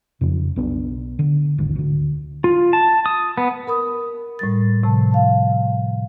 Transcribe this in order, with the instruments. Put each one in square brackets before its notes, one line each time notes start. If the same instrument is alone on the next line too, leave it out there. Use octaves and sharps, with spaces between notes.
[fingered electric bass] F2 C#3
B1 B3 D4
D3
D#1 G#1 D2
D2 D3
[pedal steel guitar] F4
A5
D#6
B3
[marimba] A#4 B5 D#6
A2 G3 A6
A2 C3 F3 A5
F5 A5